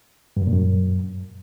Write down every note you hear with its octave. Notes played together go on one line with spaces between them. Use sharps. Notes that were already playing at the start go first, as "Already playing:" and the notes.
G2
F#2
A#2
F#2